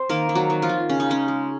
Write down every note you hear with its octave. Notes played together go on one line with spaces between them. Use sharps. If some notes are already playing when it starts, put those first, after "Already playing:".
Already playing: C4 C5
D#3 A#3 A#4
D#3
F#3 F#4
D#3
F3 F4
D#3
C#3 C#4
D#4
G#3 C#4
G#3